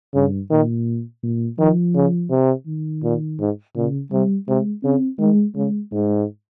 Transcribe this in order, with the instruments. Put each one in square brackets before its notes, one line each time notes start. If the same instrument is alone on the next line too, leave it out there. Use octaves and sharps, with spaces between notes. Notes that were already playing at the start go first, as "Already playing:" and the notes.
[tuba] G2 [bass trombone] C#3
[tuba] A#2 [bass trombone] D#3
[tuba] A#2
[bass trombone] D#3 [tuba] F3
[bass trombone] C#3
C3
[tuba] D#3
[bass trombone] A#2
G#2
[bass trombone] A#2 [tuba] C#3
[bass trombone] C3 [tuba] G3
[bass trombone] C3 [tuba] G#3
[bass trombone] C#3 [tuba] C4
[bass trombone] D#3 [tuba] G#3
[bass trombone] C#3 [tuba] G#3
[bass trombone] G#2 [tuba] G#3